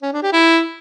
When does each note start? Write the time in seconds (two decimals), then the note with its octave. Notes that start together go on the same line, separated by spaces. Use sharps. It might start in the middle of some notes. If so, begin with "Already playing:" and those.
0.02 C#4
0.12 D4
0.22 G4
0.33 E4